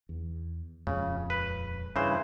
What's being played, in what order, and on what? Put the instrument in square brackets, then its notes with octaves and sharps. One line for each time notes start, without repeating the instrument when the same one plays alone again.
[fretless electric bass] E2
[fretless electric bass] D#1 F2 G#3 [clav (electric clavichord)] C#3
[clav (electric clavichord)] B4
[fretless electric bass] G2 [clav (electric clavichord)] C#3 E3 C5